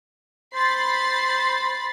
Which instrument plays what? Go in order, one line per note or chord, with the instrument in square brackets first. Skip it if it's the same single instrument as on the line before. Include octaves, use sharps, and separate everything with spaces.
[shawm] C5 [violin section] B5 A6 C7